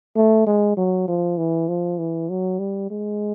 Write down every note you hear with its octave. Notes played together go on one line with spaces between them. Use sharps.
A3
G#3
F#3
F3
E3
F3
E3
F#3
G3
G#3